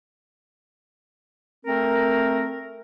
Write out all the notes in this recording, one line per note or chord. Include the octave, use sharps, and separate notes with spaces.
A3 C4 A#4